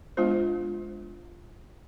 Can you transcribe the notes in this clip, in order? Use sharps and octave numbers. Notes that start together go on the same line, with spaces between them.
G#3 B3 D4 F4 C5